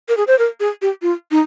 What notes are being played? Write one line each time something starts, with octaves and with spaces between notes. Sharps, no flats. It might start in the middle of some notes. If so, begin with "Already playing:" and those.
A#4
G#4
C5
A#4
G#4
G4
F4
D#4